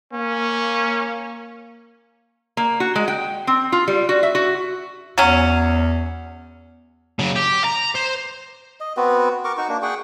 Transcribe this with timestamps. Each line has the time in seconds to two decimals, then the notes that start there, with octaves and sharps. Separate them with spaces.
0.13 A#3 C#4
2.57 A#3
2.80 F#4
2.95 G#3
3.08 G5
3.47 C4
3.72 F4
3.88 G3
4.09 F#4
4.23 E5
4.35 F#4
5.18 E2 F#3 C#4
7.19 C#3 F#3
7.36 G4
7.65 A#5
7.95 C5
8.80 D#5
8.97 B3 C4 F#4 B4
9.44 A#4 C#6 D6
9.57 D#4 F#4 C#6
9.69 A#3 D4
9.82 G#4 F#5 G5 C#6